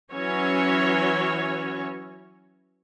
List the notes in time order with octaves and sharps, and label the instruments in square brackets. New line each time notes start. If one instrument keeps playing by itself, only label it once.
[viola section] E3 F#3 C#4 F#4 C#5